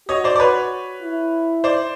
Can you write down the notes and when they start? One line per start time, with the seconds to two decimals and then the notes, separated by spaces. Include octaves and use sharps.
0.09 F#4 C#5 D#5
0.24 C5 D5
0.36 D5
0.40 B4 C#5
1.02 E4
1.64 C5 D5